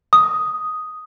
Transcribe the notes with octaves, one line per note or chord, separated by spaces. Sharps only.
D#6